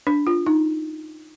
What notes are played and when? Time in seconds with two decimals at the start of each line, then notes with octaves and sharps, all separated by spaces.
0.07 D4
0.27 F4
0.46 D#4